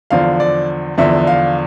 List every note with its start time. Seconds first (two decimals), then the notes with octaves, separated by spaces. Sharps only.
0.10 E2 D3 F3 F5
0.40 D5
0.98 E2 D3 F3 E5
1.27 F5